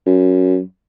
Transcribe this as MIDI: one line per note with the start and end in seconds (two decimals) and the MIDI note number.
0.06 0.59 42